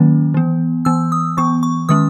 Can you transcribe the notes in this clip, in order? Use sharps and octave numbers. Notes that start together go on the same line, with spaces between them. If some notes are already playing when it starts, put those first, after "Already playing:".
Already playing: D#3 F#3 A#3 C#4
E3 B3
E3 B3 E6
D#6
E3 B3 C#6
C#6
D#3 G#3 C#4 D#6